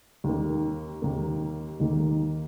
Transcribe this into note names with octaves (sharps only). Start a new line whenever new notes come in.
D#2 D#3 A#3
D#2 D#3 A#3
D#2 D#3 A#3